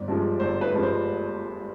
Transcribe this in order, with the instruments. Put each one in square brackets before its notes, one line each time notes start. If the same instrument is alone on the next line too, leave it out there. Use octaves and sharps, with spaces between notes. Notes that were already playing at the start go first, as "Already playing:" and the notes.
Already playing: [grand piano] G1 D5
G2 F3 G#3
G1 C5
B4
G2 F3 G#3
C5